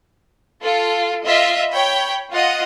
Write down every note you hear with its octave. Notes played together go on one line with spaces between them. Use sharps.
F4 A4
F4 D#5 E5
C#5 G5 B5
F4 D#5 F#5